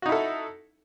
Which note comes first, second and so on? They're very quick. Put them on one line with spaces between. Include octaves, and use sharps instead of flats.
F#4 D#4 E4 A4